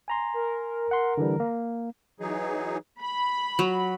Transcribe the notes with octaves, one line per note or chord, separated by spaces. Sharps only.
G#5 A#5 C6
A#4
F#5 C6
D3 E3 G3
A#3
E3 F#3 D#4 G#4
B5
F#3